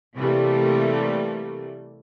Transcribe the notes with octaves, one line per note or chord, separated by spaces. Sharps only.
C3 E3 G3 A3 A#3